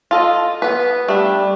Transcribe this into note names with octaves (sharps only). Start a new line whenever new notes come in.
F4 A4 D#5
B3 B4
G3 A3 D4